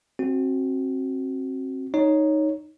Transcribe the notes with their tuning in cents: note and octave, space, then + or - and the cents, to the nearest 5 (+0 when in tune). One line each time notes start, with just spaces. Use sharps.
C4 +25 F#4 +0
D#4 +0 C#5 +0